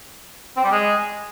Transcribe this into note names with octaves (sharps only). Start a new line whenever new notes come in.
C4
G3
G#3